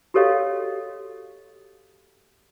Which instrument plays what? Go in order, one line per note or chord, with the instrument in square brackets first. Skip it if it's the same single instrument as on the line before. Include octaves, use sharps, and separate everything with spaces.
[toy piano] F#4 G4 A4 C#5 D#5 F5